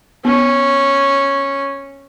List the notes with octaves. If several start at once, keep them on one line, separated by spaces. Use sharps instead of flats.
B3 C#4